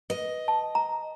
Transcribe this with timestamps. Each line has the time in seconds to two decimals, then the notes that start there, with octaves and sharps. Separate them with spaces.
0.10 B4 D#5
0.48 A5
0.75 A#5